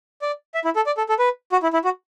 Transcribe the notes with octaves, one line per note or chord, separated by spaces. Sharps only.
D5
E5
E4
A4
D5
A4
A4
B4
F#4
E4
E4
F#4